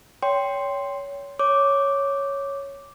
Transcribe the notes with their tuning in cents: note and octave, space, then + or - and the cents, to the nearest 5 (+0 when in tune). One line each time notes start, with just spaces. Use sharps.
C#5 +25 G5 +0 C6 +0
C#5 +0 D6 -5